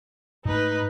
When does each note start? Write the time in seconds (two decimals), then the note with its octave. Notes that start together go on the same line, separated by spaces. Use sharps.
0.45 G#2 A3 D#4 B4